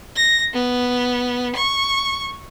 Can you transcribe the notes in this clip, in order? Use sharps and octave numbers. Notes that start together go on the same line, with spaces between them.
A#6
B3
C#6